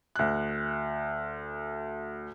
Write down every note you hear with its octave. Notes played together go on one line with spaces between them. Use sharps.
D2 F#6